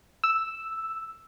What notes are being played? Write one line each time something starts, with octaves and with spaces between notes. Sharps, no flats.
E6